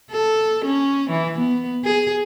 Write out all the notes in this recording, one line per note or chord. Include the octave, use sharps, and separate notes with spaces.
A4
C#4
E3
B3
G#4